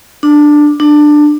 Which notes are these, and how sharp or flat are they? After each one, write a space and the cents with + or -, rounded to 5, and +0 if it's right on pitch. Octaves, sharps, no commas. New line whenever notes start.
D4 +10
D4 +15